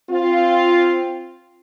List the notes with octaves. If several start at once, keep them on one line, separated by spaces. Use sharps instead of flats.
C4 F4